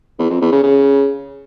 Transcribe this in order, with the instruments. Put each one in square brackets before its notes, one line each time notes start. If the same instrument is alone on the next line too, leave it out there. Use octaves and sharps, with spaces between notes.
[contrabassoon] E2
F2
E2
C#3
C#3